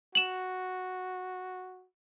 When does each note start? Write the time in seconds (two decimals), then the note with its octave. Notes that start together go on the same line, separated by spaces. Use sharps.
0.15 F#4 E7 F#7